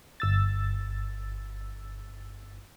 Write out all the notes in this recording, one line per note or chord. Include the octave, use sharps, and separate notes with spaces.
G1 E6 A6